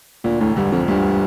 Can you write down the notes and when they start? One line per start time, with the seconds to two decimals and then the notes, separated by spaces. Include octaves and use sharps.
0.24 D2 A#2
0.40 E1 A2
0.57 G2 D3
0.72 F2 F3
0.88 D2 G2